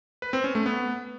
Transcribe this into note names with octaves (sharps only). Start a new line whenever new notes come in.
B4
C4
C#4
A3
B3